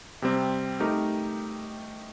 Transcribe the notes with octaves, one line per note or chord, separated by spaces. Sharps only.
C3 G3 C4
A3 D#4 G4 A#4